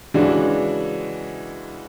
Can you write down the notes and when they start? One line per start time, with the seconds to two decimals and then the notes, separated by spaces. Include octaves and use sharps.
0.14 C#3 E3 G#3 D4 F#4